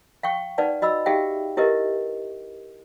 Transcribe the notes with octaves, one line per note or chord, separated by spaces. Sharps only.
F5 G5 C#6
D#4 B4 D5 F#5 A5
F#4 D#5 B5 E6
D#4 G4 G#4 E5 F5 G5
E4 G4 A#4 B4 D#5 E5